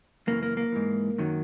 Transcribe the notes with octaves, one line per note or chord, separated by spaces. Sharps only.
F#2 C#3 E3 A#3
A#3
A#3
G#2 E3
F#2 D#3 F#3